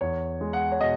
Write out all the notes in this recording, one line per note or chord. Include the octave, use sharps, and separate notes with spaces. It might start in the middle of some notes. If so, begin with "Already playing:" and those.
E2 C#5
G#3
F#5
C#5
B2 D#5